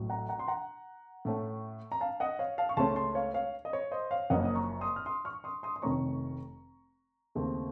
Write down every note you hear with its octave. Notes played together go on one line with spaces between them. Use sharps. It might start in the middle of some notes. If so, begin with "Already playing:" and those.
Already playing: A1 A2 F#3
F#5 A#5
F#5 A#5
C6
F#5 A#5
A2 A3 C#4
A#5
F5 A5
D#5 F#5
C#5 F5
F5 A5
C#6
C#2 C#3 A3 C#4 A5 C6
A5 C6
C#5 F5
C#5 F5
D#5
C#5
C5 D#5
C#5 F5
F#1 F#2 F3 A#3 C#4 D#5 F#5
D#6
A#5 C#6
C6 D#6
F6
C6 D#6
C#6 F6
C6 D#6
C6 D#6
C6
F1 F2 D#3 A3 C#4 A#5 C#6
D#2 C#3 A3 C4